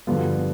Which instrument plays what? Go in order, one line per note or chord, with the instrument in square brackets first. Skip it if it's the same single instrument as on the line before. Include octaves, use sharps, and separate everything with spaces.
[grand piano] G2 D3 F3 B3 F4